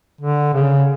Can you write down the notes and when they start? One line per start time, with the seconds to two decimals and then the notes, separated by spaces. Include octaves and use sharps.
0.21 D3
0.54 C#3